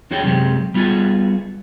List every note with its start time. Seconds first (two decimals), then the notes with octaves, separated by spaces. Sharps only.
0.11 E2 D4 F#4 G#4 C#5 G5
0.24 F#2 C3 F#3 G#3 G4
0.74 G3 B3 F4 F#4 G#4